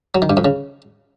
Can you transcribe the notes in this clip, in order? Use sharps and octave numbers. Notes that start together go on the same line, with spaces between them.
F#3
D#3
G2
F2
C#3